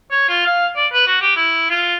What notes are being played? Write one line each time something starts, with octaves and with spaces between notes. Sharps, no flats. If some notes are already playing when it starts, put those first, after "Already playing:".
C#5
F4
F5
D5
B4
F#4
G4
E4
F4